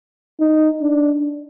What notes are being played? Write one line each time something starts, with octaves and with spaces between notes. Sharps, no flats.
D#4
D4